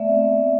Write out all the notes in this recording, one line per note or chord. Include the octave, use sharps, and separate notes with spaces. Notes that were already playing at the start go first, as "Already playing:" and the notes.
Already playing: A3 B3 D5 E5
C4
A3